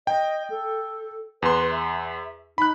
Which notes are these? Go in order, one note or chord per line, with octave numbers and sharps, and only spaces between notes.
D#5 G5
A4
E2 B4 C6
E5
D#4 B5 F#6